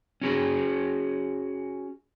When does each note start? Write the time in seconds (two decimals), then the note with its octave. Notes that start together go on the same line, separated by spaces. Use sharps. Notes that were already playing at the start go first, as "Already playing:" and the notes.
0.21 C#4 F#4 G#4